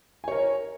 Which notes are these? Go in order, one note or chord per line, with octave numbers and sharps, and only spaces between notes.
A#4 C#5 G#5